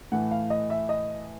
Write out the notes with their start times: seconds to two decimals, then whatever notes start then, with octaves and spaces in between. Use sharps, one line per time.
0.12 A2 E3 A3 F#5
0.31 F5
0.50 D#5
0.70 E5
0.89 D#5